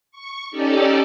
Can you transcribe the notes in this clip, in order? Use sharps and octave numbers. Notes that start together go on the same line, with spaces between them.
C#6
C#4 D#4 G4 A4 D5